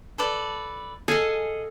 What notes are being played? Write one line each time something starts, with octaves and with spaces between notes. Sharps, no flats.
A4 B4 D5
G#4 A4 D#5 F5 G#5